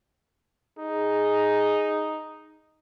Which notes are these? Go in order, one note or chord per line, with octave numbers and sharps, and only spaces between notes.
D#4 G#4